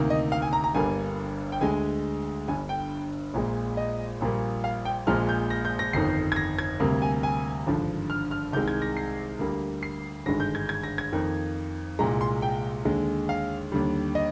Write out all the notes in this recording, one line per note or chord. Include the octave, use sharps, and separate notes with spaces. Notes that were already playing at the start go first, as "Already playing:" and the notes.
Already playing: D2 C3 D#3 A#3
D#5
F5
G#5
A#5
A#5
G1 G2 D3 G3 A#3 G#5
G5
D2 D3 G#3 G#5
G1 G2 D3 G#5
G5
A#1 A#2 G#3
D#5
A#1 A#2 G3 A#3
F5
G5
A#1 A#2 F3 G#3 F6
G6
A#6
G6
A#6
G1 F2 D#3 C7
G#6
A#6
G#6
D2 C3 G3 A#3
G#5
G#5
G#1 G2 D3 F3
F6
F6
C2 C3 D#3 G#3 G6
G#6
A#6
C7
D2 D3 G3 A#3
C7
G#1 G2 D3 G#3 A#6
G6
G#6
G#6
A#6
G#6
F2 D#3 A#3
C2 A#2 G#3 A#5
C6
G5
D#2 D3 G#3
F5
D#2 D3 G3
D#5